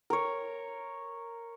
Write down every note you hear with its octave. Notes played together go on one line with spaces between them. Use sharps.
A#4 C#5